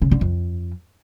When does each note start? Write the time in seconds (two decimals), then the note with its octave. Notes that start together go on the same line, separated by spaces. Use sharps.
0.02 C#3
0.11 D3
0.21 F2